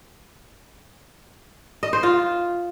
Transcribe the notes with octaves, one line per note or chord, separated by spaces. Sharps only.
D#5
C5
F4